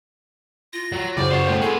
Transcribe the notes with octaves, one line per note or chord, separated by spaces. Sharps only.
F4 A#6
F#3
F#2 C#3 E4 F#4 C5 D5
C5 C#5 F#5 C#6
A3 G5 C6
G#4 A4 B4